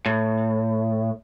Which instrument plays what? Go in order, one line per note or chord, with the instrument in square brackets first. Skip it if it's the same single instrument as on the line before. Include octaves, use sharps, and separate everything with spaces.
[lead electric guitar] A2